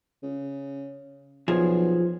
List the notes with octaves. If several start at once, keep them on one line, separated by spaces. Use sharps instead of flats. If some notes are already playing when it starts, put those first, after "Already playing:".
C#3
B1 F3 G#4